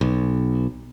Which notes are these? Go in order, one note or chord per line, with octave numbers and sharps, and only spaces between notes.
B1